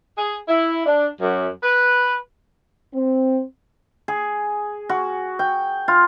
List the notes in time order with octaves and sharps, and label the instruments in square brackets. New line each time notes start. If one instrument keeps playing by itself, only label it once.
[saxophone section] G#4
E4
D4
F#2
B4
[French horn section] C4
[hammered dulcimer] G#4
F#4
G5
F4